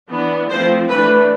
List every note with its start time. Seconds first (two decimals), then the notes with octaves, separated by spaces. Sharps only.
0.09 E3 B3 D4
0.49 F3 A3 C4 C5
0.89 E3 A3 D4 B4